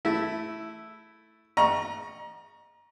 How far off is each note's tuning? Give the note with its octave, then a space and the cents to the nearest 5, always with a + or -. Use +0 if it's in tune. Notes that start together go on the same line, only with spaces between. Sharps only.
A3 +0 E4 +0
D#5 -35 A#5 +25 C#6 +0